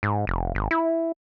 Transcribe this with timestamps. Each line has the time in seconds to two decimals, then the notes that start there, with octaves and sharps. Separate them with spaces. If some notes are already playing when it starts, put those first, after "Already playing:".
0.03 G#2
0.27 F1
0.55 G#1
0.71 E4